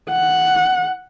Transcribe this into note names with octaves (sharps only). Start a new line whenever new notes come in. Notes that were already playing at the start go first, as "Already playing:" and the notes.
F#5